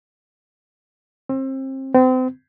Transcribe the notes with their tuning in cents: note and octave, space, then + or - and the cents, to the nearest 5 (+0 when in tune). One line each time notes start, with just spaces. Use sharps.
C4 +30
C4 -35